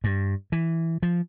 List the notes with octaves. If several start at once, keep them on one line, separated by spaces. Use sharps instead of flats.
G2
E3
F3